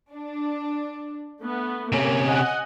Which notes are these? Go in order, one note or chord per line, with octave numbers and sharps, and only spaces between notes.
D4
A3 B3
C3 A#3 C#4
D#5 F#5 G#5